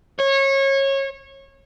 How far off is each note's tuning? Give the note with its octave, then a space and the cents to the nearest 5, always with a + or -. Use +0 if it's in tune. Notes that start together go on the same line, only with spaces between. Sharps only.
C#5 -25